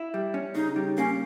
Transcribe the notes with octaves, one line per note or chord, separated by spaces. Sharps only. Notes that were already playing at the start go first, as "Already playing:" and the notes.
Already playing: E4
G3
C#4
C#3 D#4
G3
A#3 C#4